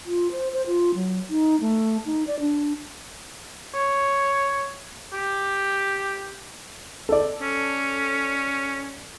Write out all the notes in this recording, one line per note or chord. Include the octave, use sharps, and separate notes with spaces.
F4
C5
C5
F4
F#3
D#4
A3
D#4
D5
D4
C#5
G4
A4 D5
C#4